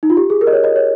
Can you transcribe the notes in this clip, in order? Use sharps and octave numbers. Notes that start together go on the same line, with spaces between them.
D#4
F4
G4
G#4
A#4
D#5
C#5
D#5
C#5